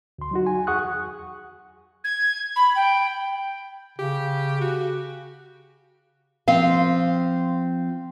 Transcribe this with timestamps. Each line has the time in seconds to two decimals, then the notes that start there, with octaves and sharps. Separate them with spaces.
0.19 D2 C6
0.31 F#3 D#4 F#4
0.47 G#5
0.67 E2 G#4 F#5 C#6 D#6 F#6
2.04 G#6
2.56 B5
2.75 G5
3.99 C#3 G4
4.61 F#4
6.48 F3 C4 F5